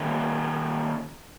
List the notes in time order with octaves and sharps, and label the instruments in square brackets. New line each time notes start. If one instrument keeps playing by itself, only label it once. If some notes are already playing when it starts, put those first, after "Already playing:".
Already playing: [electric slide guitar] D#3 A#3 C#4